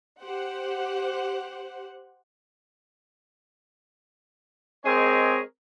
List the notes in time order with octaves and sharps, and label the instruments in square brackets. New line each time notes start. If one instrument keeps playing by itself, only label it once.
[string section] G4 C5 F#5
[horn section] G#3 C4 G#4 A#4 C#5 D#5